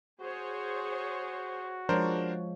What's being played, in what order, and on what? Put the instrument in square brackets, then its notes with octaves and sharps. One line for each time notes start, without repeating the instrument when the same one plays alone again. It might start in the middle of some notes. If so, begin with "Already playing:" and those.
[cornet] F#4 [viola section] G#4 C5 C#5
[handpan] F3 G#3 C#5 [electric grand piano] D4 A#4 C5